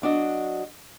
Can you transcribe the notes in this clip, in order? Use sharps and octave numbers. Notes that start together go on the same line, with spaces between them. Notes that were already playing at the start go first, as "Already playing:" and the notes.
F#3 D4 F#4 D#5